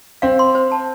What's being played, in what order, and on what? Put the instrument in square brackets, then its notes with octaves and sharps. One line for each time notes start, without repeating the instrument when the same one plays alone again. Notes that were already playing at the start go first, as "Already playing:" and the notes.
[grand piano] C4 [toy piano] F5
[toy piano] C6
C5
A5